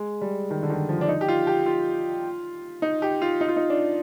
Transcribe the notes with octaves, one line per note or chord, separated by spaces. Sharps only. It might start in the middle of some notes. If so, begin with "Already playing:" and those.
Already playing: G#3
G3
D#3
D3
D#3
F3
D4
D#4
G4
F4
G4
F4
D#4
G4
F4
D#4
F4
D#4
D4